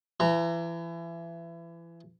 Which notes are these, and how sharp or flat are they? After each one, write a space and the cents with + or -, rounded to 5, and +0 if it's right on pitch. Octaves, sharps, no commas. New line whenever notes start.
E3 +30 A#5 -20